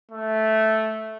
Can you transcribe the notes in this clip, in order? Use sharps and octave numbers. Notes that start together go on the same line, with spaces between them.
A3